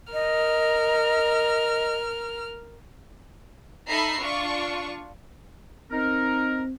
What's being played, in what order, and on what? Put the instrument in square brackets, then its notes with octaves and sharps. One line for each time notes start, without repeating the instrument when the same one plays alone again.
[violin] A#4 F6 [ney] D#5
[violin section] D#4 A4 E5 A#5 B5 C7
D4 F4 C#6
[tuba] C4 [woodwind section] D#4 A#4